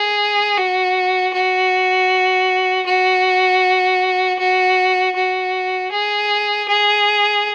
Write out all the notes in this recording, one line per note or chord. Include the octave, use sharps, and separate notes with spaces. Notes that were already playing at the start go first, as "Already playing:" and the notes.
Already playing: G#4
F#4
F#4
F#4
F#4
F#4
G#4
G#4